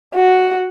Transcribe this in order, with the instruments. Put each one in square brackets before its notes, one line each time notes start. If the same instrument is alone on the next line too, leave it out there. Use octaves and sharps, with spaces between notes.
[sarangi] F#4